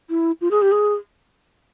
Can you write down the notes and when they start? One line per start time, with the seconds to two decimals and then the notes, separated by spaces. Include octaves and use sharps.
0.10 E4
0.41 F4
0.51 G#4
0.62 G4
0.72 G#4